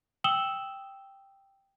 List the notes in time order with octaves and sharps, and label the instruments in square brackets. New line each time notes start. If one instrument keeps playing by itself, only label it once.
[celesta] G5 D#6 E6 E7 F#7 G7